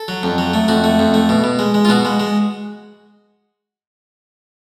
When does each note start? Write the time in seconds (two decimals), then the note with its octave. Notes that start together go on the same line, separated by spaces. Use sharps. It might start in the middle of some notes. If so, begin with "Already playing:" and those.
Already playing: A4
0.08 F#3
0.23 F2
0.38 F#3
0.54 A3
0.68 F2 F#4
0.84 A3
0.99 F2
1.14 A3
1.29 B2
1.44 B2
1.59 G#3
1.74 G#3
1.85 F4
1.89 B2 F#4
2.05 G#3
2.20 G#3